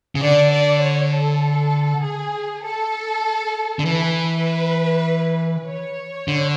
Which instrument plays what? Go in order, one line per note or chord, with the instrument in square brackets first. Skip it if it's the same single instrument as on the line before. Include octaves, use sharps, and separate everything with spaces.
[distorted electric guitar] C#3
[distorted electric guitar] D3 [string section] D5
[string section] D5
C#5
A4
G#4
A4
[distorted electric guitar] D3
[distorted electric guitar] E3 [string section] B4
[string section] C#5
[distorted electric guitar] D3